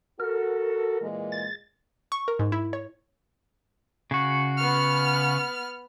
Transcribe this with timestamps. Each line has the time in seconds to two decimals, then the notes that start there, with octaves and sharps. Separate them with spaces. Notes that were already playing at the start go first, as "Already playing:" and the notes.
0.20 F#4 A4 A#4
1.01 A#2 E3 G#3
1.32 A6
2.12 C#6
2.28 A#4
2.39 G#2
2.52 E4
2.73 C#5
4.11 C#3 F#4
4.57 B3 F6